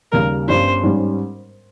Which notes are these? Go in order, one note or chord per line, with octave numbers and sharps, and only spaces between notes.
D#2 C#3 G3 A#4
G1 G2 G3 C#4 C5
G#2 G3 C#4